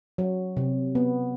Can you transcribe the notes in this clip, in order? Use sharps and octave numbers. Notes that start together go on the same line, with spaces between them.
F#3
C3
B3